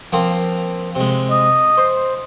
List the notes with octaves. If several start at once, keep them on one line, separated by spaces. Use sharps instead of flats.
F3 A#3 C4
C3 G#3
D#5
C5